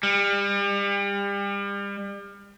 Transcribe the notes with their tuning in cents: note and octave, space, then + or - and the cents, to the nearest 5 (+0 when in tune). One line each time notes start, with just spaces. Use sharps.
G3 +35